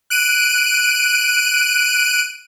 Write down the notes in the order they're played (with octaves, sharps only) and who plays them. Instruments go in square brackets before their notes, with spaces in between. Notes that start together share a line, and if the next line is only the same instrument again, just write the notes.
[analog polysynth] F#6 D7 D#7